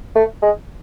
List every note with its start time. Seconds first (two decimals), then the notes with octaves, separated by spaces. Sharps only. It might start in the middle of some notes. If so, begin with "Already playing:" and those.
0.15 A3
0.42 G#3